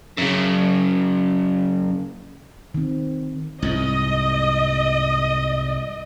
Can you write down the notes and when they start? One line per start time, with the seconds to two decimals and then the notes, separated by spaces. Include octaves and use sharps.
0.18 F#2 C#3
2.74 D#3 C4
3.62 C2 G#2 D#5